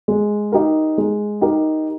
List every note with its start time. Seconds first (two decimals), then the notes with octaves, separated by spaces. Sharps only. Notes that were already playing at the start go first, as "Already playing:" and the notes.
0.08 G#3
0.52 D#4 G4 A#4
0.98 G#3
1.41 D#4 G4 A#4